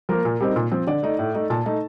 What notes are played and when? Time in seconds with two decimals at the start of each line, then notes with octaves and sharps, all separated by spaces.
0.09 F3 A#3 A#4
0.25 A#2
0.41 G3 C4 D#4
0.56 A#2
0.72 F3 C4
0.87 D3 D5
1.03 A3 D#4
1.19 A2
1.34 A3 D#4
1.50 A#2 A5
1.66 A3 D#4